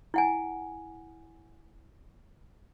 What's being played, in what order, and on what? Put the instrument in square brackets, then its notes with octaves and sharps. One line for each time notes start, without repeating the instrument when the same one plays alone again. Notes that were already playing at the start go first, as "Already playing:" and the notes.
[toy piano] E4 F#5 G#5